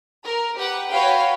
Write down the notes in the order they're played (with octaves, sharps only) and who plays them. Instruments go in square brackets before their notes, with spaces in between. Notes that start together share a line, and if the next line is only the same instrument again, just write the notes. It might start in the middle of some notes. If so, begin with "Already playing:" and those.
[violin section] A#4
G4 B4 F#5
F#4 B4 C#5 F5 G5